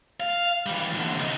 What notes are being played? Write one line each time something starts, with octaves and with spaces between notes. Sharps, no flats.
F5
E3 G3
E2 D3
C3 D#4